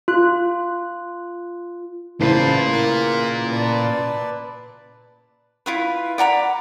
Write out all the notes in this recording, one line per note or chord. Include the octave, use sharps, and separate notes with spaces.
F4 F#6
A1 A#2 C#3 F4 B4 C5 A5 C7
A#4 F6 F#6
B4 D5 A5
E4 F4 B4
D5 F#5 A#5 B5